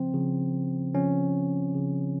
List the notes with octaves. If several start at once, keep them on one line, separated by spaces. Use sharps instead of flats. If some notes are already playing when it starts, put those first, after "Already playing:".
Already playing: C#3 F3 C4
C#3 F3
C#3 F3 C#4
C#3 F3